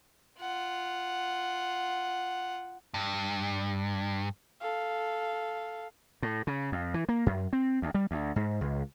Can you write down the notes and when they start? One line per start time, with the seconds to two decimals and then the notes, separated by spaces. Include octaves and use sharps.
0.39 F4 F#5
2.94 G2
4.61 A4 F5
6.22 A2
6.47 C#3
6.72 F2
6.94 E3
7.09 A#3
7.26 F#2
7.53 C4
7.82 D2
7.94 G3
8.11 D2
8.36 G#2
8.61 C#2